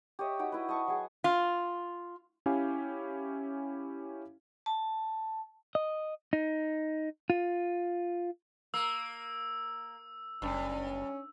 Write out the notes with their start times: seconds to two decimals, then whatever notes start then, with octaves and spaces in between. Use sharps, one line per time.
0.19 G4 C#5 D#5 E5
0.39 D#4 F#4 G5
0.52 E4 B4
0.68 D#5 A5 C#6
0.88 F#3 G#4
1.24 F4
2.46 C#4 E4 G4 F5 G#5
4.66 A5
5.75 D#5
6.33 D#4
7.30 F4
8.74 A#3 E6
10.42 F#1 G2 C#4